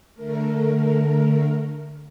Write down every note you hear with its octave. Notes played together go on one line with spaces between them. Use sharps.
D3 A3 A#4